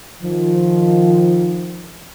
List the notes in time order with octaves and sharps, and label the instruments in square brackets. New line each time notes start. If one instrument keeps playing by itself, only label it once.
[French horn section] D#3 F3